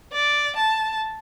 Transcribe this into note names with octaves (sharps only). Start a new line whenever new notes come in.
D5
A5